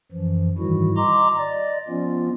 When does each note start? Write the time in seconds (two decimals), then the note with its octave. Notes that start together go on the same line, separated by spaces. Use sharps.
0.12 F#2 E3 F3
0.58 G#2 D#3 E3 G3 E4 F#4
0.97 D#5 A#5 C6 D6
1.39 D5 D#5
1.88 F3 B3 C#4 F4